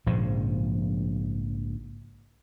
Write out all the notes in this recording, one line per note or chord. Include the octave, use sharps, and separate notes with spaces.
A#1 G#2 C#3 F3